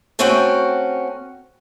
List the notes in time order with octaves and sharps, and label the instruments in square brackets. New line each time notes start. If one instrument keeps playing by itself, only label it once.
[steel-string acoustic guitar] A3 C4 C#4 F#4 F#5 G5